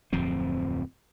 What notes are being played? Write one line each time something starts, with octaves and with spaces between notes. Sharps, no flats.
D1 F2 F3 C4